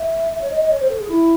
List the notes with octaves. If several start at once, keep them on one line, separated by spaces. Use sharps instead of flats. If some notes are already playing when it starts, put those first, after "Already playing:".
Already playing: E5
E5
C#5
D#5
D#5
C#5
C5
A4
G#4
E4